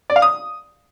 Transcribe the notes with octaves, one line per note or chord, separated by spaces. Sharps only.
D5
F5
D#6